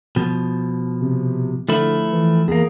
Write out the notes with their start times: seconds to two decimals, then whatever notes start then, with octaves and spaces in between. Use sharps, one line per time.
0.16 B2 F3
1.01 C3
1.69 D3 F3 A3 E4
2.12 E3
2.48 E2 A#3 G#4